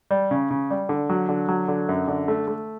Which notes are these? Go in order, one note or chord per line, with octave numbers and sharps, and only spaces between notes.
G3
C#3
C#3
G3
D3
F#3
D3
F#3
D3
F#2
D3
A3
A3